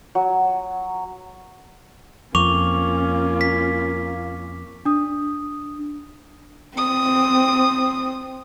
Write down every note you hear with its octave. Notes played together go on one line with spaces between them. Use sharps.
F#3
F2 A#3 C#4 F4 C#6 D6 F7
B6
D4 D#6
C4 D#6